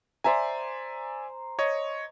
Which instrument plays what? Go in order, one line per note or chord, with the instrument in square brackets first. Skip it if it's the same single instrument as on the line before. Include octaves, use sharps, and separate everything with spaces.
[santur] C5 A#5 [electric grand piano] D5 E5 G#5
[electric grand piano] C#5 D#5 C#6